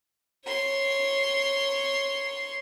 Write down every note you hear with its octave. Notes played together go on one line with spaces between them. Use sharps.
C#5 C6